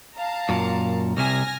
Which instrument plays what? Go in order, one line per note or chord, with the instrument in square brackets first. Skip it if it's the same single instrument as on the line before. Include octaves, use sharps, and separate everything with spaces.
[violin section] F5 A5 A#5
[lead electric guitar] F#2 A#2
[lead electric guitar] C2 C3 [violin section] G#5 F6 A#6